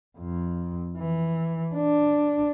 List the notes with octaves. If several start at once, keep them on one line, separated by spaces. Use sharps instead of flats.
F2
E3
D4